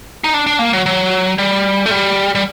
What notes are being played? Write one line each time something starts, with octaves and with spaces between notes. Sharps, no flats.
D#4
D4
D4
A#3
F#3
F#3
G3
A3
G3
G3